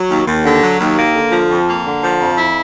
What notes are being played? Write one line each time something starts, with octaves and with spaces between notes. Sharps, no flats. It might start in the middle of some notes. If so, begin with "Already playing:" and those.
Already playing: F#3
D#2
D#2
D3
F#3
D#2
A#3
D3
F3
F2
A#3
D3
F3
F2
E4